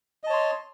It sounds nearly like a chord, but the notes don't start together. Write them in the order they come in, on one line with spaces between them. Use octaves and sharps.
D#5 A5 C#5 C6